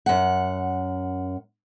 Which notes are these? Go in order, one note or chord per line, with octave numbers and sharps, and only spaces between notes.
F#2 F#5